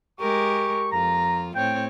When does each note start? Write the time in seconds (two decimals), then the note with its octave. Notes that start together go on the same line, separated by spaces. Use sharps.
0.20 G#3 G4 A#4 C#6
0.92 F2 F4 A#5
1.56 A2 C4 C#5 G5